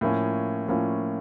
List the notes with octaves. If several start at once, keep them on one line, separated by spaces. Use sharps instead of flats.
A2 F3 A#3 C#4 F4
A2 F3 A#3 C#4 F4